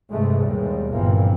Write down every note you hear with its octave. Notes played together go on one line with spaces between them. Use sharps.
G2 C3 E3 G#3 A3
D#2 B2 G3 G#3
G1 A#2 E3 F3 A#3 C4